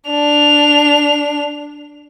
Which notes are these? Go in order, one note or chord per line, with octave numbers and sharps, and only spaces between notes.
D4 F7